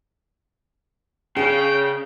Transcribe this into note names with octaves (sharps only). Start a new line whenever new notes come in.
C#3 D4 G#4 G5